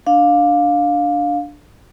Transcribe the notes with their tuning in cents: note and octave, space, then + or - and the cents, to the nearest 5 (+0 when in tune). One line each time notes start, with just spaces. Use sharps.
D4 +0 F5 +15